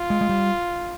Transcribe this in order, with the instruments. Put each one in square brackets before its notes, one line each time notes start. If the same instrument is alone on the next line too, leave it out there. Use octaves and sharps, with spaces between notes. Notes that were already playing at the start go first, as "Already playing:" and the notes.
Already playing: [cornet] F4
[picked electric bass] G#3
G#3
G3